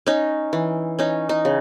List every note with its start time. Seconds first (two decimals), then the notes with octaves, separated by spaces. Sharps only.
0.06 C#4 D#4
0.53 E3
0.99 C#4 D#4
1.29 D#4
1.45 C#3